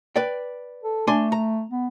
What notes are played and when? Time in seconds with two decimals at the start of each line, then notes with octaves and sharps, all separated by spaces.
0.16 B4 D5 G5
0.83 A4
1.07 A3 D4 G#5 C6
1.32 A#5
1.70 B3